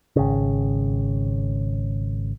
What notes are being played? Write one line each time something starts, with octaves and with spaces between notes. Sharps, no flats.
G#1 C#3